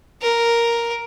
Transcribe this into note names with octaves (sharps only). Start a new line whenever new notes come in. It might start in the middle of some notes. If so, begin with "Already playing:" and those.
A#4